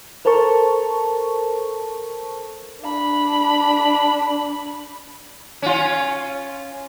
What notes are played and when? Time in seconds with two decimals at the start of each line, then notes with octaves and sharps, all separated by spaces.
0.25 A4 A#4 C5 A5 C#6
2.82 D4 B5
5.62 C#4 F4